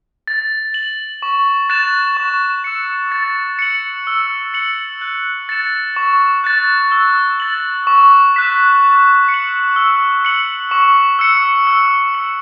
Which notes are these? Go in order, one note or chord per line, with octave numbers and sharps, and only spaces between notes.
A6
F#7
C#6
F#6 A6 E7
C#6
E6 C#7
A6
C#7 F#7
E6
C#7 F#7
F#6
A6 C#7 E7
C#6
F#6 A6
E6
A6 F#7
C#6
F#6 B6 E7
A6
C#7
F#7
E6
C#7 F#7
C#6
E6 C#7
E6
C#7 F#7